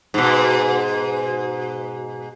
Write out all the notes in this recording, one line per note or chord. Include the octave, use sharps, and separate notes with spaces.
G#2 B2